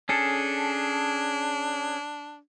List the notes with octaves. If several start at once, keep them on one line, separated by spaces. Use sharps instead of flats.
C#4 D4 G#4 A4